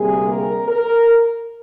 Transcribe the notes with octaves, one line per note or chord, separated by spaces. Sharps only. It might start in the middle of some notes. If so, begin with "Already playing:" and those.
Already playing: D2 C3 G3 A#3 G#4
A#4
A#4